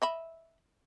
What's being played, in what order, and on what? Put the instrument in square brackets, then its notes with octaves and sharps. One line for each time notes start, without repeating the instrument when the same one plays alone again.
[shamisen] D#5 E5 B5